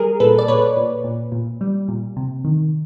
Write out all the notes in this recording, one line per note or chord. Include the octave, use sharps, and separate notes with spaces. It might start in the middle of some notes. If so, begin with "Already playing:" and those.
Already playing: G3 G#4 A#4
A#2 A4 B4
D5
A#2 B4 C#5
A#2
A#2
A#2
G3
A#2
C3
D#3